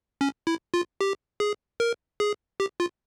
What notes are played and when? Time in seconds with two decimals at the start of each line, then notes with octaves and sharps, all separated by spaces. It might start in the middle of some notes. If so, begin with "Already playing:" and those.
0.21 C#4
0.47 E4
0.74 F4
1.01 G4
1.40 G#4
1.80 A#4
2.20 G#4
2.60 G4
2.80 F4